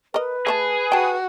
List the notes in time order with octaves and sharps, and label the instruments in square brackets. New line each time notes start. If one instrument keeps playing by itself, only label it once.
[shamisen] A#4 D#5 [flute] B4
[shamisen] A3 C5 A5 [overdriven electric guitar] G#4
[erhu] F#4 [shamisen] G5 A5